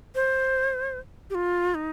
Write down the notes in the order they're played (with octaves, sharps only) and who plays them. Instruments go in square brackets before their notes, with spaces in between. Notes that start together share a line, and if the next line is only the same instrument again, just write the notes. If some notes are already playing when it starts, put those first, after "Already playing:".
[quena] C5
G4
F4
D#4